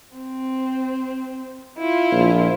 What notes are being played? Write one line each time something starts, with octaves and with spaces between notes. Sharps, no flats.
C4
E4 F4
A#1